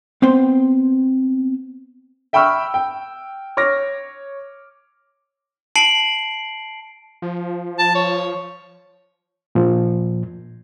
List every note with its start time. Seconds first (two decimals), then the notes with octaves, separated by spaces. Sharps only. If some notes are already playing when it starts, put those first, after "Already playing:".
0.22 B3 C4 B4 C5
2.33 E5 G5 B5 C#6 E6 F6
2.74 G5
3.57 C#5 D6 F6 A#6
5.76 A5 C7 D7 F#7
7.22 F3
7.79 A5
7.95 C#5
9.55 A#2 F3